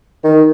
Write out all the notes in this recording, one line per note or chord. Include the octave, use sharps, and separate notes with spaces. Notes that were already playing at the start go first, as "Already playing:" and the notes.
D#3